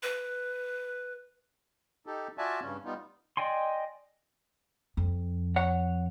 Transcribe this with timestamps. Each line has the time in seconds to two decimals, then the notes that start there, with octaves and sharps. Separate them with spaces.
0.03 B4
2.06 D#4 G4 A4
2.38 F4 F#4 D5 E5 G#5 A5
2.62 G2 C#3 C#4
2.85 G3 B3 D#4 F4
3.37 D5 D#5 G5 G#5 C6
4.97 F2
5.56 C#5 F#5